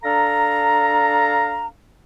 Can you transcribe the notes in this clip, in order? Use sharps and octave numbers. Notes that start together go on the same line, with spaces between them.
D4 A4 F5 A#5